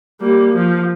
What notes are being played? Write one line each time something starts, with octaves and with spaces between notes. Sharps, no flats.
G3 A#3
F3